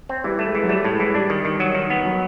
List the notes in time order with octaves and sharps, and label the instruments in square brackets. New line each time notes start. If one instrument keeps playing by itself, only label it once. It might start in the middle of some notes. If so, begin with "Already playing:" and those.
[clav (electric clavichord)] C4
[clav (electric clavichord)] E3 [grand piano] G3
[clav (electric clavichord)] A3
[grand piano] G#3
[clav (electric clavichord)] E3
[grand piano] F#3
[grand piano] G3 [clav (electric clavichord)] A3
[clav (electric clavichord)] A2
[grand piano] G#3
[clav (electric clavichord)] E3
[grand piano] G3 [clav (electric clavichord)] D4
[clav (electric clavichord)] D#3
D#3
F#3
D#3
B3
[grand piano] F#3